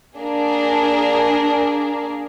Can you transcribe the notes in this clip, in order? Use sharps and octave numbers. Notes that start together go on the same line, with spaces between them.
A#3 D4 G#4 A#4